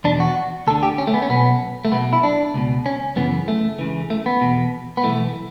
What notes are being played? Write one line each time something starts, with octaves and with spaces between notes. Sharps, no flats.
E2 B2 D4
F#4
D2 D3 A4
G4
C#4
A3
B3
C#4
B1 B2 B3
A3
B1 B2 B3
E4
D4
C#2 B2
C#4
F#2 C#3 E3 B3
A3
C#2 C#3 E3
A3
B3
E2 B2
B3
B1 A2 E3 A3